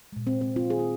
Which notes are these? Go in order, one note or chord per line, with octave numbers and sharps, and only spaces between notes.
A#2 G#3
C4
C4
C4 F4
D#3 G#3 G#4
F4